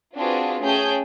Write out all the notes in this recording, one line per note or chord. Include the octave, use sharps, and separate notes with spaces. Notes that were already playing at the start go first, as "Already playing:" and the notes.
C4 D4 F4 F#4 G#4 B4
A3 C#4 G#4 G5 A5 G6